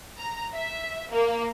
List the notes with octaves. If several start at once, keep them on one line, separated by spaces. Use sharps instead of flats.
A#5
E5
A#3